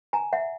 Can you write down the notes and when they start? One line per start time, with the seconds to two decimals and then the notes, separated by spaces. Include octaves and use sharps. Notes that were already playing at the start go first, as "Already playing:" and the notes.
0.13 G#5 A#5
0.33 E5 F#5